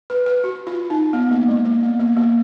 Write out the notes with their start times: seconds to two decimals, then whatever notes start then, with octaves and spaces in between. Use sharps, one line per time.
0.10 B4
0.26 B4
0.44 F#4
0.67 F4
0.90 D#4
1.13 B3
1.31 A#3
1.48 G#3
1.65 A#3
1.83 B3
1.99 A#3
2.17 A#3